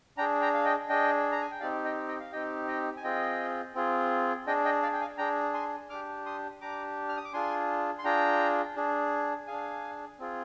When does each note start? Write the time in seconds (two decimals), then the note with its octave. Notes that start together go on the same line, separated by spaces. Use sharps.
0.18 D4 G5 A#5
0.21 G#4
0.41 G5 A#5
0.54 F5
0.65 D#5 G5
0.89 D4 G#4 D#5 G5
1.32 A#5
1.41 G#5
1.51 G5
1.60 C4 D#4 G4 D5 F5
1.85 D#5 G5
2.08 D#5 G5
2.20 F5
2.32 C4 D#4 G4 D#5 G5
2.68 D#5 G5
2.97 G#5
3.04 C4 F4 G#4 D#5 G5
3.75 C4 F4 G#4
4.46 D4 G#4 D#5 G5
4.65 D#5 G5
4.82 D5 F5
4.93 G5
5.01 F5 G#5
5.18 D4 G#4 G5 A#5
5.54 G#5 C6
5.89 D4 G4 D6 F6
6.26 C6 D#6
6.61 D4 G4 A#5 D6
7.09 F6
7.17 D#6
7.25 D6
7.33 D4 F4 G#4 G#5 C6
7.99 C6
8.04 D4 F4 G#4 G5 A#5
8.76 D4 G#4
9.47 D4 G#4 F5 G#5
10.19 C4 F4 G#4